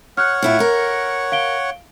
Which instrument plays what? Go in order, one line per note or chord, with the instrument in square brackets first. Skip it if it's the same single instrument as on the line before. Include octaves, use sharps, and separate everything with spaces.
[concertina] C#5 F#5 [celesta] F6 F#6
[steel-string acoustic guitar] A2 E4 F4
A#4
[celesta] F5 D7 G7